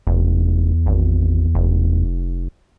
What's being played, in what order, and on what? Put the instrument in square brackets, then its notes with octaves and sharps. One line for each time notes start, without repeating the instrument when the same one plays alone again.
[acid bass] F1 [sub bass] E2
[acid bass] G#1
F1